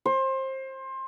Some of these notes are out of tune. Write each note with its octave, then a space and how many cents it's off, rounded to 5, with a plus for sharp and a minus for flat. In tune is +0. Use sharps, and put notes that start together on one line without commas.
C5 +25